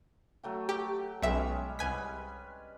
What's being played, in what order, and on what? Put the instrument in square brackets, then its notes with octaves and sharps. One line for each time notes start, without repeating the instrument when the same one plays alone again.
[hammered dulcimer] F#3 A3 G5
[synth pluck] G4
[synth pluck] B1 E5 [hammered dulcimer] G3 G#3 C#4
[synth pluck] C2 G#5 B6 [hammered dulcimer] B4